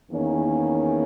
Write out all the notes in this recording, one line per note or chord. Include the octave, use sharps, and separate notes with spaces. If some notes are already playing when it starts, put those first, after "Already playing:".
E2 D#3 A#3 C#4